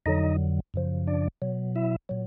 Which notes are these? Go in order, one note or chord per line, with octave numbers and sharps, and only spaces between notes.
F2 D3 F#3 D#4 D#5
F#2 C#3 F3
D4 D5
B2 F#3
E4 E5
A#2 F#3